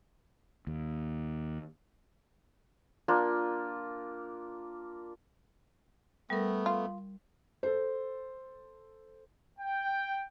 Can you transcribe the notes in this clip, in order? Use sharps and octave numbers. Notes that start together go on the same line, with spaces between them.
D#2
A#3 D4 F4
G3 A3 B3 A#4
F4
A4 C5
G5